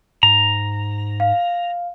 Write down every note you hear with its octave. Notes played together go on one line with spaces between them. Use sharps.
G#2 A#5
F5